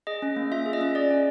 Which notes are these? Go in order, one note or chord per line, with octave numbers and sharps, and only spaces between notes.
G#4 D#5
C#4
A#3
F4 E5
G#4
D#5
C#4
G#4 D5
C#4